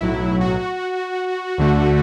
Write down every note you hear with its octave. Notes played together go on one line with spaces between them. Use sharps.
B1 A2 F#3 E4
F#4
D2 D3 A3